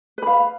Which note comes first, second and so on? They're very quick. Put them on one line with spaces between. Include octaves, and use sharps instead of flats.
B4 B5 F5